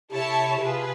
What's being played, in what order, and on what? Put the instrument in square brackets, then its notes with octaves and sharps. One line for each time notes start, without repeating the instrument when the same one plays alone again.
[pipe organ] C3 [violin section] E4 A4 C#5 E5 A5
[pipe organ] C3 [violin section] F4 G#4 B4